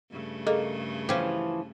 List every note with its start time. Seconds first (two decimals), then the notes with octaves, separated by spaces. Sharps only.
0.11 G2 C#3 A3
0.47 A#3 G#4 A4 D#5
1.09 E3 F3 C#4 G4